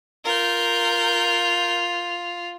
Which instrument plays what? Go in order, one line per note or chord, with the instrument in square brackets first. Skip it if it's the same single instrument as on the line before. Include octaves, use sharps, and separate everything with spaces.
[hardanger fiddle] F4 [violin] A#4 G6